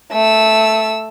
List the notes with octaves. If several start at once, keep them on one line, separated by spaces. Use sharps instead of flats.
A3 E6